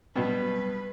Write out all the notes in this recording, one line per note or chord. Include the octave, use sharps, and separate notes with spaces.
G2 B2 F#3 G3 B3 B4